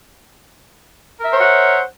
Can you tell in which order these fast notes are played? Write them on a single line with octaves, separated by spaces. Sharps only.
A#4 E5 C5 C#5 F#5